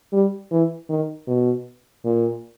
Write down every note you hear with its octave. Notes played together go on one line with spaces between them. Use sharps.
G3
E3
D#3
B2
A#2